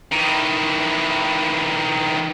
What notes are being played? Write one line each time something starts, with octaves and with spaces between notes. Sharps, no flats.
D#3 E3